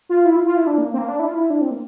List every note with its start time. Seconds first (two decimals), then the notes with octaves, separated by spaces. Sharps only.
0.09 F4
0.26 E4
0.36 F4
0.47 F4
0.57 E4
0.67 D4
0.78 A#3
0.94 C4
0.98 A#3
1.08 D4
1.20 E4
1.28 F4
1.34 E4
1.50 D4
1.61 C4
1.71 A#3